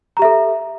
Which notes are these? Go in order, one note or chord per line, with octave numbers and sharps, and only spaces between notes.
G4 A4 E5 A#5